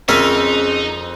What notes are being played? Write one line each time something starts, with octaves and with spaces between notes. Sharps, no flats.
F2 C#3 C4 C#4 D#4 A#4 E5